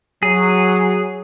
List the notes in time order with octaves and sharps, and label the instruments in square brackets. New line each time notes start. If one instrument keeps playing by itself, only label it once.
[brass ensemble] F#3 [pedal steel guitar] G#4